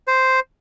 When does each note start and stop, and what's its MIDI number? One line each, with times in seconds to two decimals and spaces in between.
0.07 0.40 72